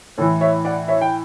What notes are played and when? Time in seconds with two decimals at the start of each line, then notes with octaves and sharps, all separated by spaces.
0.18 A2 E3 A4 C#5
0.41 C#5 E5
0.65 D5 F#5
0.88 C#5 E5
1.01 G5